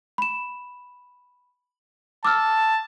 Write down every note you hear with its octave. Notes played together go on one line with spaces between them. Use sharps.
B5 E7
A5 D6 E6 F6